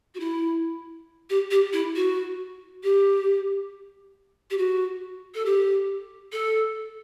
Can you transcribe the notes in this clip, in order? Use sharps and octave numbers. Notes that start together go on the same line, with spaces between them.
F#4
E4
G4
G4
E4
F#4
G4
G4
F#4
A4
G4
A4